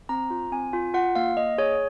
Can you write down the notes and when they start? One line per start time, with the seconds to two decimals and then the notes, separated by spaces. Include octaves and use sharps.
0.09 C4 A#5
0.30 F4
0.52 C4 G#5
0.73 F4 G#5
0.94 F4 F#5
1.16 A#3 F5
1.37 A#3 D#5
1.58 G#4 C#5